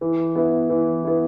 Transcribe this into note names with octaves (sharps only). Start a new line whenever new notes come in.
E3
B3 E4
E3
B3 E4